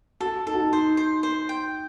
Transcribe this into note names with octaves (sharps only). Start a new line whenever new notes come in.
F#4 A4
D#4 A4
F#4
D#4
D#4 C5
C5
C5
G5